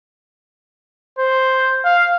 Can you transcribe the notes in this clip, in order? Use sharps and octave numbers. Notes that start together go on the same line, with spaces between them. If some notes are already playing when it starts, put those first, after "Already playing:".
C5
F5